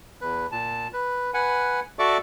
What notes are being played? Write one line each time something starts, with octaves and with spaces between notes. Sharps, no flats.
E2 B4
A#2 A5
B4
B4 F#5 G#5
F#4 A4 D5 E5 C#6 D6